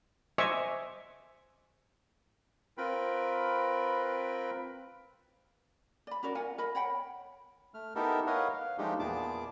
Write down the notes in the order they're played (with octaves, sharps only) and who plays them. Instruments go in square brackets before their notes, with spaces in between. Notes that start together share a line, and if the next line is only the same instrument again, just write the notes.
[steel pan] C5 D#5 E5 G#5 C#6 D6
[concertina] C4 F4 A#4 B4 G5 B5
[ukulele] D5 B5
C#4 F#4 A#4 D5
F4 A#4 F#5 G#5
A#4 D#5 B5
C#5 F#5 G5 B5
[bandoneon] A3 F6
B3 D#4 E4 G4 A4 A#4
A#4 B4 C#5 D#5 F5 F#5
F5
F3 G#3 A3 D4 D#4 G4
E2 A#2 B3 G#4 A5 D6